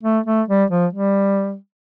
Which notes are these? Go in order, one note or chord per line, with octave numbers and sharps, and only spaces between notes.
A3
A3
G3
F3
G3